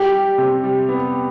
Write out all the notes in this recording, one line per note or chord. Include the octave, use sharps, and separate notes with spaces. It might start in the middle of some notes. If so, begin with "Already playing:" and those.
Already playing: G3 G4
G3
C3
G3
B3